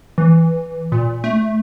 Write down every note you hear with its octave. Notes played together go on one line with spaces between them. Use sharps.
E3
A#2
A3